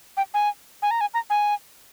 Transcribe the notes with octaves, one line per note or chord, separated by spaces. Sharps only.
G5
G#5
G#5
A#5
G#5
A#5
G#5